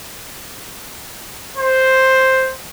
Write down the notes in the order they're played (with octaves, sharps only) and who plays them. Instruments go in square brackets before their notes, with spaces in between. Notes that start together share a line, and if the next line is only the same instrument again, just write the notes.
[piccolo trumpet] C5